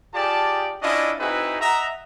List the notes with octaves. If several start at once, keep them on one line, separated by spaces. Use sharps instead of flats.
F4 G4 G#4 D5 A5
C#4 D4 E4 F4 D#5
C4 D#4 E4 F#4 G#4 B4
D#5 E5 F#5 A#5